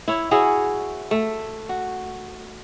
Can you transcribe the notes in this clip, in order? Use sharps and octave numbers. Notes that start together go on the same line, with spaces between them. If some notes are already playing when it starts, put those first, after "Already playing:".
E4 C#5
E4 F#4 G#4 C#5
A3
F#4